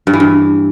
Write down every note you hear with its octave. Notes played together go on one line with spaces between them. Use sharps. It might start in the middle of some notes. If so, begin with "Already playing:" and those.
G2
E3
G2